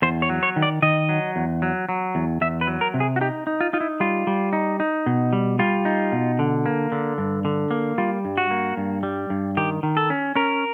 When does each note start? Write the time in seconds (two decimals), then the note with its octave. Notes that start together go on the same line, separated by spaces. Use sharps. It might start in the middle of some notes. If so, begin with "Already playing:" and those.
0.02 E2 C5
0.22 C#5
0.29 F#3
0.43 C#5
0.56 D#3
0.62 D5
0.82 D#3 D#5
1.09 F#3
1.36 E2
1.62 F#3
1.89 F#3
2.15 E2
2.41 E2 E5
2.61 B4
2.67 F#3
2.81 A#4
2.94 C3
3.00 G#4
3.16 F#4
3.21 D#4 G4
3.47 D#4
3.61 F4
3.73 D#4 F4
3.81 E4
4.00 G3 F4
4.27 G3
4.53 D#4
4.80 D#4
5.06 B2
5.33 G3
5.59 G3 F4
5.85 D#4
6.12 B2
6.39 D3
6.66 A#3
6.92 D3
7.18 G2
7.45 D3
7.71 A#3
7.98 G3 F4
8.25 G2
8.38 F#4
8.51 A#3
8.77 G2
9.03 G3
9.30 G2
9.57 D#3 G4
9.83 D#3
9.97 A4
10.10 C#4
10.35 C#4 A#4